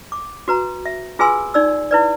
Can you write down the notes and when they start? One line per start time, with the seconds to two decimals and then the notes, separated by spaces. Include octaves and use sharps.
0.12 D6
0.48 F#4 B4 A#5
0.86 E5
1.19 F4 G#4 B4 G#5 C6 E6
1.54 D#4 D5 E6
1.91 E4 B4 D5